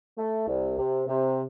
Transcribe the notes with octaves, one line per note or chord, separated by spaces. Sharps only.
A3
C2
C3
C3